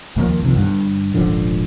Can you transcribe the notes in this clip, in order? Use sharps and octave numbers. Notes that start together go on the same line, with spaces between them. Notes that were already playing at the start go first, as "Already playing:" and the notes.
D#2 D#3 F3 A#3
C2 C3 D#3 F3
G1 G2
D#1 G#1 D3 F3